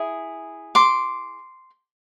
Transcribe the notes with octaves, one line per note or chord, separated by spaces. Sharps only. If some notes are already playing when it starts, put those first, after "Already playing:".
Already playing: E4 G#4
C6 D6